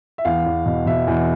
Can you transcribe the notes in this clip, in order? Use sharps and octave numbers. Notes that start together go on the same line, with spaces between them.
E5
E2 F5
E2
B2
B2 E5
E2